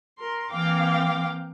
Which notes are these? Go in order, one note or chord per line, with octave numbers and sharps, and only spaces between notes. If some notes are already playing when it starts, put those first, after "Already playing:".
A#4 C6
E3 A#3 C4 F5 G5 D6